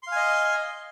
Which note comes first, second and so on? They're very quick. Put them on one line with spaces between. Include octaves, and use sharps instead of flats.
C6 F5 G#5 D#5